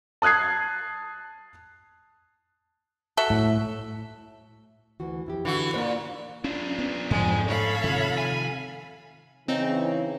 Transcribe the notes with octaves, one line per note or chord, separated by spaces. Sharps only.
A5 D#6 F#6 G#6 C7
F#4 A4 E5
A2
D2 E3 F#4
F2 E4 G4
D3 E3 F#4
G2 A#2 A#3 C5
C#4 D4 F4
B3
F2 G#2 G#3
A4 C#5 F5 B5
C3 D#3 F3
G#5
C#3 E3 C4 D#4